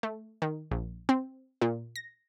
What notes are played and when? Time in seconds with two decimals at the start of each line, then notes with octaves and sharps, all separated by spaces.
0.03 A3
0.42 D#3
0.71 A#1
1.09 C4
1.62 A#2
1.96 A#6